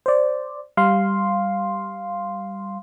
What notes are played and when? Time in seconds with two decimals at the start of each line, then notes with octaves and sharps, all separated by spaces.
0.06 C5 D5
0.77 G3 F5 C6